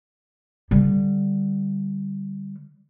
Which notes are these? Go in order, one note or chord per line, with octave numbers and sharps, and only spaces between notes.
D3 G3